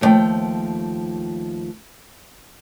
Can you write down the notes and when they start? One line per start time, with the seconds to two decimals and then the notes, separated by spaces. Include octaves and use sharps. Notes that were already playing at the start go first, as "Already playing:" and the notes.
0.01 D#2 B2 F3 A3 G5